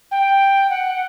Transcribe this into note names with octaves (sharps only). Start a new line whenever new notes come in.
G5
F#5